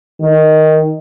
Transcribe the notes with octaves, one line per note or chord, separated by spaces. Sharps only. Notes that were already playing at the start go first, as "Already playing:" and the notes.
D#3